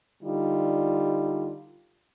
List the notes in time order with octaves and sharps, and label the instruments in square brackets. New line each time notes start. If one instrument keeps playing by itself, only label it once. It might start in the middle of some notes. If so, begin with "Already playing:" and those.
[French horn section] D3 G3 D#4 F4